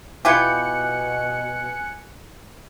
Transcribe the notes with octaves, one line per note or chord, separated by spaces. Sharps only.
B2 E4 F4 G4 G#5 F#6 C#7